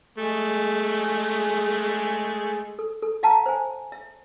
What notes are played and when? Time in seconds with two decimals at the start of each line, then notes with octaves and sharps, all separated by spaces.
0.18 G#3 A3 G#4
2.79 A4
3.02 A4
3.23 D#5 F5 F#5 A5 A#5
3.46 C5 G#5
3.92 E5